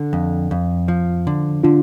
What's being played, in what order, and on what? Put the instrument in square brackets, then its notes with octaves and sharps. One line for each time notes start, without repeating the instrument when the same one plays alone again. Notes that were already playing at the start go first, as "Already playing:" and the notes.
Already playing: [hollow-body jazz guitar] D3
F2
F2
F3
D3
[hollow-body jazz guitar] D3 [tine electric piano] D4 F4